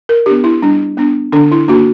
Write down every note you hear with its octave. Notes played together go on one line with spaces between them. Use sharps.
A#4
B3 D4 G4
E4
G3 D4
B3 D4
D3 D4
E4
A#3 D4 F#4